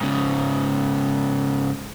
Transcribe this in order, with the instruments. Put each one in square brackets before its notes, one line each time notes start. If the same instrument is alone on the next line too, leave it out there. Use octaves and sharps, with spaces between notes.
[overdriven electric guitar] G#2 C#3